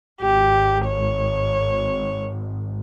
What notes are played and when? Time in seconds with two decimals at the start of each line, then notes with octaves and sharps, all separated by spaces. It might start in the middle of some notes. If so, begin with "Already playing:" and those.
0.21 G#1 G4
0.86 C#5